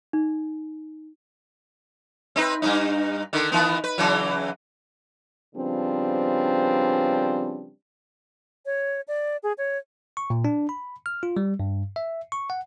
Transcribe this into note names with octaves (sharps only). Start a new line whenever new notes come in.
D#4
C4 D#4 B4
G2 C#3 D#4
D3 D#3
D#3 E3 B3
B4
C#3 E3 F#3
C#3 F3 G3 B3 C4 D4
C#5
D5
G#4
C#5
C#6
A#2
D4
B5
F6
F4
G3
G2
E5
C#6
F#5